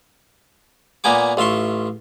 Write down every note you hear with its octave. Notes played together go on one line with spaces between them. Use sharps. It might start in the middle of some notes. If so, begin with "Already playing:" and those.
A#2 A#3 B3 G#5 D6
A1 F4 E5 C6 C#6